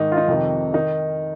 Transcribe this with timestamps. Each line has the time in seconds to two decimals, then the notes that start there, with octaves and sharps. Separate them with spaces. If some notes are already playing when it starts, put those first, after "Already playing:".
Already playing: G#2 D#3 D#4
0.12 F4
0.17 D#4
0.28 F2 C3 D#3
0.74 D#3 D#4